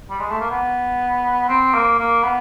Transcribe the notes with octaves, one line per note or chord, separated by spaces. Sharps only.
G3
G#3
A3
A#3
B3
C4
A#3
A#3
B3